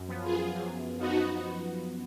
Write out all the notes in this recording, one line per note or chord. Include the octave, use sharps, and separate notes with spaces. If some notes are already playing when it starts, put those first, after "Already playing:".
Already playing: F#2
F3 B3
F4 G#4
F#2
F3 B3 D#4 F#4